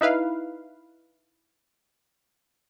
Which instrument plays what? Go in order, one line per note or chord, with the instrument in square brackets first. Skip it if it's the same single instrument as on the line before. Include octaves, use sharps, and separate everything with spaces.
[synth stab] D#4 E4 B4 F5